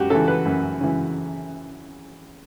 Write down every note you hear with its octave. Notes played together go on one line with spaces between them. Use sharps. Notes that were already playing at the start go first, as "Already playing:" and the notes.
Already playing: F#2 F#4 G4
C#3 E3 A4
B4
F#2
C#3 E3